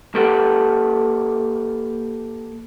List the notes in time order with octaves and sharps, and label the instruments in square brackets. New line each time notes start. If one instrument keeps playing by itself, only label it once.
[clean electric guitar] A#3 G4 A4 B4 F#5